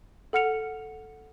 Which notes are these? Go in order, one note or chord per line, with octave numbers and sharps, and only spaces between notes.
A4 F#5 F6 C#7 F7